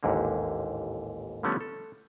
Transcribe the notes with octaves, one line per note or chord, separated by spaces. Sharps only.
A1 D#2 G#2 D3 A#3
D3 F3 G3 A3 B3 C#4
A4